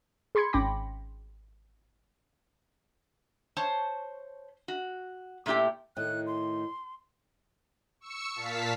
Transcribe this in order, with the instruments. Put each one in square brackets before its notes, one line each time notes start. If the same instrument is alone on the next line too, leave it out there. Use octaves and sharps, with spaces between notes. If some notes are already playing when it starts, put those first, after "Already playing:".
[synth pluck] G#4 B5 C6 G#6 C#7
G#1 C#4 G5 B5 D6 A#6
[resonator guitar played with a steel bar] C5 C#5 A5
F#4
A#2 A3 E4 G4 G5
[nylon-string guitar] A2 D#3 [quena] F#6
[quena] C6
[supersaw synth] C#6 E6 C#7
A#2 F5 A5 B6